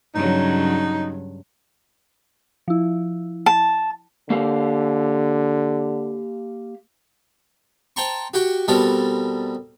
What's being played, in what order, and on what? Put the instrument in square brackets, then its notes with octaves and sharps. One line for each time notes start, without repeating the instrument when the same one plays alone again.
[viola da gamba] G2 C#3 F#3 [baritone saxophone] D#4
[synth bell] F3 E4
[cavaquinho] A5
[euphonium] D3 [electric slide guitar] A#3 G4 F5
[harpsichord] C5 G5 A5 A#5 C6 C#6
F#4 G4 G5 C#6
B2 G3 C4 G4 A4 A#4